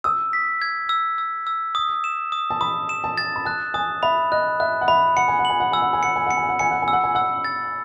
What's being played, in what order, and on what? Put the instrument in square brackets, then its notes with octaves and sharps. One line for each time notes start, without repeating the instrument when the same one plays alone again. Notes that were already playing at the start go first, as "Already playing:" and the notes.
[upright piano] D#6 [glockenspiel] E6
[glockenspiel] B6
G#6
E6
E6
E6
D#6
E7
D#6
[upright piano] A5
[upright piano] B5 [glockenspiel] D#6
[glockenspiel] E7
[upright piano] A5
[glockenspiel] A6
[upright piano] B5
[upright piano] A5 [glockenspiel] F#6
[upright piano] G#5 [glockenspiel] D#6
[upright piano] E5 [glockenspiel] B5
[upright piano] D#5 [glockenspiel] F#6
[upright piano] E5 [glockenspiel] F#6
[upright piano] F#5
[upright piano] E5 [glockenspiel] B5
[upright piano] F#5 [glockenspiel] C#7
[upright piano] G#5
F#5
[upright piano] G#5 [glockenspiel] F#7
[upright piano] F#5
[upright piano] G#5 [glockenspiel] E6
[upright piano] F#5
G#5
[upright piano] F#5 [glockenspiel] C#7
[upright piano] G#5
[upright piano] F#5 [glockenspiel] C#7
[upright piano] G#5
F#5
[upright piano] G#5 [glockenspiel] C#7
[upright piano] F#5
G#5
[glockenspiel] E6
[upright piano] F#5
G#5
[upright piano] F#5 [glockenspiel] E6
[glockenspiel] A6